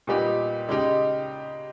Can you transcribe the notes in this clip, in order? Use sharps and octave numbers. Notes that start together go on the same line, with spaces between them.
A#2 G3 B3 D#4 G4
C#3 G#3 D#4 G4